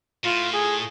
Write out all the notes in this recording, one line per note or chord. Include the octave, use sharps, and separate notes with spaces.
A2 F4
G#4